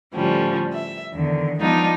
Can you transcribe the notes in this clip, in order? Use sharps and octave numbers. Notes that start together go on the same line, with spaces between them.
A2 D3 F3 G3 C#4
E5
E2 D3 D#3
F3 G#3 B3 D4 D#4 F4